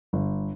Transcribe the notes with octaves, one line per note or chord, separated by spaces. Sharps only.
G1